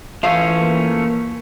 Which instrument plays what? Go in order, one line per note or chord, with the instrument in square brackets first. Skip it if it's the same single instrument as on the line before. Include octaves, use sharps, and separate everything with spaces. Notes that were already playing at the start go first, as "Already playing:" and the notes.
[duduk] E3 [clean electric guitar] F3 A3 C#4 [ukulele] F5
[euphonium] A#3